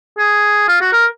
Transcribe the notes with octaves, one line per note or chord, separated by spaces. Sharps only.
G#4
F4
F#4
A#4